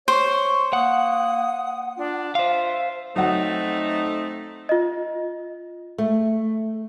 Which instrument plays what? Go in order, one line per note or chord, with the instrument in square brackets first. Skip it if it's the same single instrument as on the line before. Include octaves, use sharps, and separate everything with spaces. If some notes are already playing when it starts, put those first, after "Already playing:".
[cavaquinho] C5 [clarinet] C#5 [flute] C#6
[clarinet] A#3 [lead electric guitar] F#5 [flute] D#6
[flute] D4 [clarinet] F4
[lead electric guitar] C5 F5 [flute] E5 [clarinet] C6
[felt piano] F#3 F#5 [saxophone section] A3 C4 D#4
[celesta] F4 D#5
[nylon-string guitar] A3